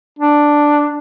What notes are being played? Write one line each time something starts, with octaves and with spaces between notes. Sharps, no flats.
D4